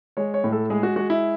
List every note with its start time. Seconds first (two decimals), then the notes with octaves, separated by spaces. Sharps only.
0.17 G#3 C#5
0.34 C#5
0.44 A2
0.52 A4
0.70 G#3 G#4
0.83 F#4
0.96 G#3 F#4
1.10 E4